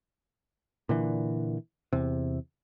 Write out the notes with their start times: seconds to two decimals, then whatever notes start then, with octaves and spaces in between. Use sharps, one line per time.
0.89 A#2 D3 E3
1.93 E2 C3